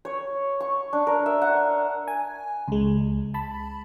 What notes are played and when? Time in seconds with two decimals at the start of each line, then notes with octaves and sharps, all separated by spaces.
0.05 C#5
0.60 C#6
0.93 D4
1.07 A#4
1.26 E5
1.42 F#5
2.08 G#5
2.68 C#2 G#3
3.34 A5 B5